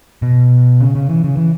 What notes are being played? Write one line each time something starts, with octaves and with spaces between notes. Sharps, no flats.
B2
C#3
C#3
E3
C#3
E3